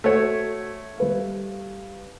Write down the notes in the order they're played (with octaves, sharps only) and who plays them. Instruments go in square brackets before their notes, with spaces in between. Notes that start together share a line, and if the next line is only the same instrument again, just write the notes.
[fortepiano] A3 C#5 [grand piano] F#4 C5
[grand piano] G3 B4 F5